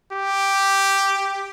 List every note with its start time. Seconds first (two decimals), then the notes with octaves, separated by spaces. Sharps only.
0.12 G4